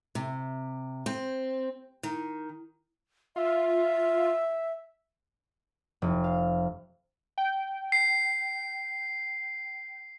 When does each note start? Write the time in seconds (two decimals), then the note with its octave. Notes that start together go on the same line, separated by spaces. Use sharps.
0.15 C3
1.06 C4
2.03 D#3
3.36 F4 E5
6.02 F1
6.24 F5
7.38 G5
7.92 C7